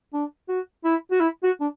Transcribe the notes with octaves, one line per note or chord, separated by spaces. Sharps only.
D4
F#4
E4
F#4
E4
F#4
D4